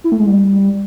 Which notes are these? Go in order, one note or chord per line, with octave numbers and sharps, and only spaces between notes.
E4
A3
G#3
G3